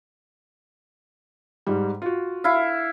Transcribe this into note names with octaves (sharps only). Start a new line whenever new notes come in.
G#2 G3
F4 F#4
E4 F5